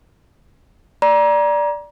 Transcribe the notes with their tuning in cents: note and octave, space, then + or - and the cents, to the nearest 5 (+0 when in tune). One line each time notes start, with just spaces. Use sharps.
D5 +0 A#5 +30